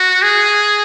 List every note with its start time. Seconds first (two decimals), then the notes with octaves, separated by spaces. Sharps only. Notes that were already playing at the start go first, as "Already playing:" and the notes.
Already playing: F#4
0.22 G#4